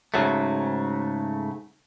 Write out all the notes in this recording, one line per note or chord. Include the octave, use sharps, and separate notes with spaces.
G#2 C#3 F#3 A3